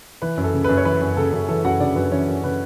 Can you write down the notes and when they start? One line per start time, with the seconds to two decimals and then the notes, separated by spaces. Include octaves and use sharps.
0.22 E3 B4
0.37 F#2
0.43 A4
0.54 C#3
0.64 F#2 B4
0.77 C#5
0.85 E3 B4
1.02 F#2
1.17 C#3 A4
1.32 F#2
1.48 E3 A4
1.65 F#2 F#4 F#5
1.80 C#3 D4 D5
1.96 F#2 B4
2.11 E3 C#4 C#5
2.28 F#2
2.44 C#3 B4